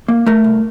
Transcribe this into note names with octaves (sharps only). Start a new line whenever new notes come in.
A#3
A3 A#4
C2